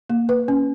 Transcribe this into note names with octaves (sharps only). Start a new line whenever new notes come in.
A#3
B4
C#4